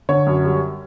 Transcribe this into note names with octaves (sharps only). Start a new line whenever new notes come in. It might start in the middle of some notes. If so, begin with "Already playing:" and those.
D3 C#5
F#2
G3